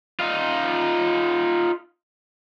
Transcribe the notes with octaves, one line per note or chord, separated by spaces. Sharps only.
D#4 F4